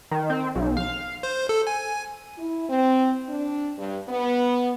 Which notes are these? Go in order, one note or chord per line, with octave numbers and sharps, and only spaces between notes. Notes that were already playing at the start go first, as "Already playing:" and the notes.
D#3
C4
B1
F5
C5
A4
G#5
E4
C4
D4
G2
B3